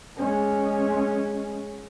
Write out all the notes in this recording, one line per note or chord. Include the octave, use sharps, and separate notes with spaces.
G#3 C#4